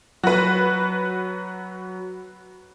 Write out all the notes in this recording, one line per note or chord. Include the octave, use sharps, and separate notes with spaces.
F#3 F#4 B4